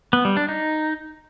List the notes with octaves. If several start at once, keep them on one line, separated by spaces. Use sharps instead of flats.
B3
G3
D4
D#4